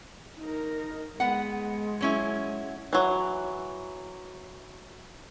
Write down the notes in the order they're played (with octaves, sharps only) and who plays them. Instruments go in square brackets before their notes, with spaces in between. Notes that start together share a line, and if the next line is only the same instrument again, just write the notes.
[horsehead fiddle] D#4 A#4
[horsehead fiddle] G#3 [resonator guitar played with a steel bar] B3 F#5
[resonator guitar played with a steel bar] F#3 C#4 E4
[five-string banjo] E3 F#3